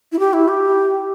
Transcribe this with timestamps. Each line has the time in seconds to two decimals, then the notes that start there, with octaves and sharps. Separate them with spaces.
0.12 E4
0.19 G4
0.33 E4
0.48 G4